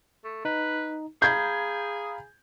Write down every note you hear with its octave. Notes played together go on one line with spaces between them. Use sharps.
A3
D#4 B4
G#4 F5 A#5 B5 G6 G#6